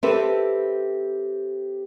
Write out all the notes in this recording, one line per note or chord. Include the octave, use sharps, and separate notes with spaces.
C4 G4 A4 B4 E5